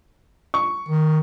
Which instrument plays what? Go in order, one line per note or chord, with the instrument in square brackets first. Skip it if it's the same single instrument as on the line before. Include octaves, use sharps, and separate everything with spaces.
[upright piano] C#6
[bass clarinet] D#3